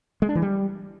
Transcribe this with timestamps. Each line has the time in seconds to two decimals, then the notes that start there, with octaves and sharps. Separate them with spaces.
0.22 G#3
0.29 D4
0.35 E3
0.42 G3